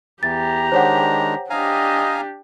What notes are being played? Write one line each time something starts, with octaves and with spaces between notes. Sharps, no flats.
E2 E3 G4 A#5 A6
D#3 G#3 D4 C5 C#5 F#5
D4 G4 D#5 F5 G#5 A#5